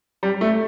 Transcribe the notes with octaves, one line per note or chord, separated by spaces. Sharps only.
G3
A3